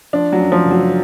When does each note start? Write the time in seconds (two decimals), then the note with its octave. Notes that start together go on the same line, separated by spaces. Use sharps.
0.13 F3 D4
0.32 F#3
0.39 F#2
0.52 F3
0.65 F#1
0.71 F#3